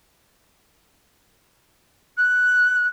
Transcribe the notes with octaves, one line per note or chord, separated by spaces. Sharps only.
F#6